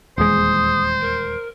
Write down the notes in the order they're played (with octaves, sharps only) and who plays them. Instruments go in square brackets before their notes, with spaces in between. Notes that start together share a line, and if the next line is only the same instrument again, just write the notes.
[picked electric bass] D#1 E2 G#3 [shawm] C5 [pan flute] D#6
[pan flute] A#4